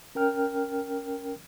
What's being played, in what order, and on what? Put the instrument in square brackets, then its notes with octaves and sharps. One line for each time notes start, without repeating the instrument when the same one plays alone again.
[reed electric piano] C#4 A#4 G5 F6